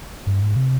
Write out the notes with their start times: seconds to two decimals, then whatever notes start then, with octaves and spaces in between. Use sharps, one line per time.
0.27 G2
0.42 G#2
0.56 C3